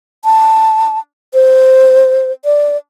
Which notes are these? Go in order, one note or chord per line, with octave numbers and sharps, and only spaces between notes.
A5
C5
D5